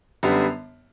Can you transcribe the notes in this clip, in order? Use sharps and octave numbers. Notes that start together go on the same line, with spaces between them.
F#2 D3 G3 B3